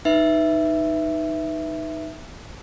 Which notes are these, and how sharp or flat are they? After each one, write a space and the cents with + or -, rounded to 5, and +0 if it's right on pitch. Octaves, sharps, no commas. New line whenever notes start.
D#4 +0 B4 +0 E5 +0